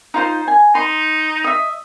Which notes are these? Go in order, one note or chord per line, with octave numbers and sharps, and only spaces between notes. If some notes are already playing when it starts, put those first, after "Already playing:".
D#4 F4 C5
G#5
D#4 C6
D#5 E5